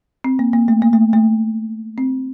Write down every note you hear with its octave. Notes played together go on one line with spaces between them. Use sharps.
C4
A#3
A#3
A3
A#3
A3
A3
C4